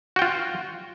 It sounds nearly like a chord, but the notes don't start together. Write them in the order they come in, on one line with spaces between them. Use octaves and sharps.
F#4 G5 F4